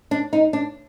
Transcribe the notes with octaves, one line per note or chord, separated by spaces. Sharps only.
D4
D#4
D4